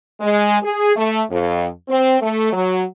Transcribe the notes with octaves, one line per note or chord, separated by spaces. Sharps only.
G#3
G#4
A3
F2
C4
A3
F#3